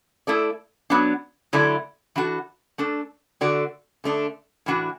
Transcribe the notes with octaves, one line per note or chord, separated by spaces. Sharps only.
A3 E4 A4 D5
F#3 B3 D4
D3 F#3 A3 E4 D5
E3 D4 F#4 A4
A3 D4 A4
D3 A3 F#4 D5
D3 A3 D4
A2 E3 D4 F#4